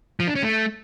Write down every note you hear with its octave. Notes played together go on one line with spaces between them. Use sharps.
F3
D4
C#4
A3